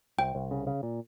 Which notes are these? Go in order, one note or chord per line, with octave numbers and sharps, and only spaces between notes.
C2 G5
C2
C#3
C#3
A#2